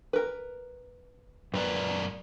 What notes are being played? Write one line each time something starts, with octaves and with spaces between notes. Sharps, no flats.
A#4 B4
F#2 A#4 B4 D5